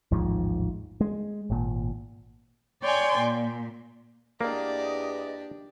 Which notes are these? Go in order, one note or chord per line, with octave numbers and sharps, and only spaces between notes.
A1 D#2 G#2 F3
G#3
G#1 A#2
C#5 D5 G5 G#5 C6
A#2
E2 A#3 D4 G4 D5 D#5